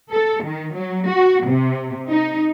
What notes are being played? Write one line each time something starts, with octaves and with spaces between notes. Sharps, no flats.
A4
D#3
F#3
F#4
C3
D#4